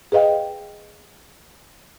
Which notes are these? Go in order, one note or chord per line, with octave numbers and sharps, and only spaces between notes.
G#4 B4 D#5 F5 G5